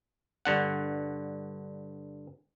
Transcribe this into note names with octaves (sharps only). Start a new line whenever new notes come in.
G2 D3 F#5